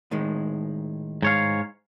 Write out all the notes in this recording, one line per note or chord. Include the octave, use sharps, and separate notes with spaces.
A2 D#3 G#3
G#2 C#5 F5